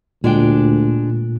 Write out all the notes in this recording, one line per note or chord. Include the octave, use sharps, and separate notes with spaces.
D2 A#2 G#3 D4 G5